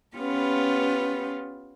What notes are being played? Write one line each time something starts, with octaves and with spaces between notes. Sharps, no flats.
B3 C#4 F4 G4 B4